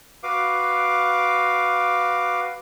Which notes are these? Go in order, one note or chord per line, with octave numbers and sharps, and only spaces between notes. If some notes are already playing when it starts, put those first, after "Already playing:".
F#4 B4 F5 D6